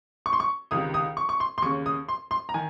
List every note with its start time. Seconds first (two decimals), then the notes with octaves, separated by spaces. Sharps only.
0.26 C#6
0.33 C6
0.40 C#6
0.71 C#2 C3 D#3 D#6
0.94 D#6
1.17 C#6
1.29 C#6
1.40 C6
1.58 C6
1.62 D#2 C#6
1.65 C#3
1.86 D#6
2.08 C6
2.31 C6
2.49 A#5
2.54 D#3 G#5